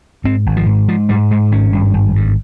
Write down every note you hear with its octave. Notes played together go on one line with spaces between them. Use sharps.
G#2 C4
G#1
F3
G#2
G#2 F3
G#2 G3
G#2 G#3
G#1 C#4
G2
G#1
G2